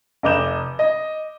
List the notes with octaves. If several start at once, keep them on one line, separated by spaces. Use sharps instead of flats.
F1 D#5 D6 G6 E7
D#5